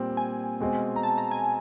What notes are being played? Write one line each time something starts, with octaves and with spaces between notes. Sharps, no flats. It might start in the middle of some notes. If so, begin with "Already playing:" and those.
Already playing: A#2 G3 C4 G5
G#5
B2 G#3 C4
A#5
A5
A#5
G#5